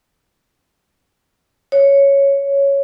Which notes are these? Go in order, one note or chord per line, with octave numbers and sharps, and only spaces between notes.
C#5